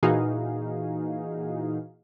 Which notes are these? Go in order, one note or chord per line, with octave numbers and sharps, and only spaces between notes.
A#2 E3 D#4 F#4 G#4 F5